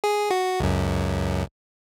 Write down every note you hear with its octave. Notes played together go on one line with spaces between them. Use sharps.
G#4
F#4
C#2 F#2